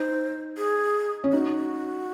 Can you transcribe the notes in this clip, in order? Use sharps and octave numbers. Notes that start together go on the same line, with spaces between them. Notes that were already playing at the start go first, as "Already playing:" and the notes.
Already playing: D#4 C5
G#4
C#4
D#4 F#4